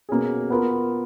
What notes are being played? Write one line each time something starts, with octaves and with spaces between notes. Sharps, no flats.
B2 A#3 C#4 G#4
B3 F4 A#4